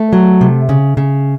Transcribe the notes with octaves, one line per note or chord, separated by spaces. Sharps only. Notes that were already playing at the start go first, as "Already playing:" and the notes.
Already playing: A3
F#3
C3
C#3
C#3